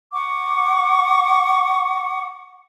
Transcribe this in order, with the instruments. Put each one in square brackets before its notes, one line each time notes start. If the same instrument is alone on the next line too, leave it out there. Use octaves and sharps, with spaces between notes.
[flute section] F#5 C#6 D6